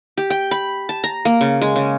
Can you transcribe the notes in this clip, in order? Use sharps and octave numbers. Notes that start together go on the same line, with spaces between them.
G4
G5
B5
A5
A#5
A#3
C#3
G#3
C#3